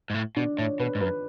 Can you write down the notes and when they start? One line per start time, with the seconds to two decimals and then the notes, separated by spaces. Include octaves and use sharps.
0.10 G#2
0.14 A2
0.36 B2 D4
0.58 A2 C#5
0.79 B2 B4
0.95 G#2
1.01 F#2 B4